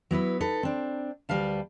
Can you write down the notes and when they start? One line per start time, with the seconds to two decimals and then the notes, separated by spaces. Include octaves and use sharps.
0.11 F#3 B3 E4 B4
0.40 D#4 A4 B4
0.63 C4 D4
1.29 D2 G3 B4 F5 A5